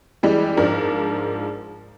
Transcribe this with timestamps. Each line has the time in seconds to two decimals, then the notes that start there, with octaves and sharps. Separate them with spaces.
0.23 E3 G3 G#3
0.57 G#2 F3 D4 A#4